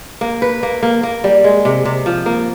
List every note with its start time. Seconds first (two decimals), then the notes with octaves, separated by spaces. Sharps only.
0.21 A#3
0.42 B4
0.63 A#3
0.83 A#3
1.03 A#3
1.24 G3
1.44 G#3
1.65 C3
1.85 C3
2.06 F3
2.26 A#3